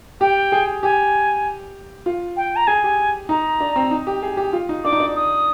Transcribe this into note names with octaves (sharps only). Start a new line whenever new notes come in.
G4 G5
G#4
G4 G#5
F4
G5
A#5
G#4 G#5
G4
D#4 A#5
D4
C4
D#4
G4
G#4
G4
F4
D#4
D4 D6
D#4
D4
D#6